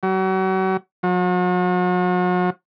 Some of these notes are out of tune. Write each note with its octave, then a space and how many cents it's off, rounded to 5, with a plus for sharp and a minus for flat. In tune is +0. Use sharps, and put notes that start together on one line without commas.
F#3 +35
F#3 -45